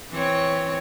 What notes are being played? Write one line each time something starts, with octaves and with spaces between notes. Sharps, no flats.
E3 C4 C#5